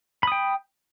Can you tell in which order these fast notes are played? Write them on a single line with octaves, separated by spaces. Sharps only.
B5 D#6 G5